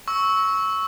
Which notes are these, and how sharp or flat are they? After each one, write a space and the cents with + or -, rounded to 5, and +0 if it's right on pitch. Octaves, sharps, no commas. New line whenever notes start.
C#6 +0 E6 -15